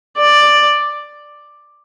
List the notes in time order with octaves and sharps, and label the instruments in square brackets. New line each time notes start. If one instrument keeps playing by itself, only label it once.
[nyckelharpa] D5